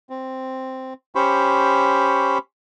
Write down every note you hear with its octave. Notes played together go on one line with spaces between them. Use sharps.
C4
C#4 G4 C5 B5 C#6